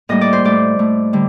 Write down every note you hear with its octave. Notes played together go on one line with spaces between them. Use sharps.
A2 G3 A#3 D#5
D5
C5
A2 A3 D5
A2 A3
D3 G3